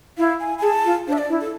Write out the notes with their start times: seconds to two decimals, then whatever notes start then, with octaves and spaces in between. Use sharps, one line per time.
0.18 E4 F5
0.40 G#5
0.58 G#5
0.62 G#4 A5
0.85 F4
1.07 D4 C5
1.13 E5
1.18 D5
1.30 E4
1.41 A4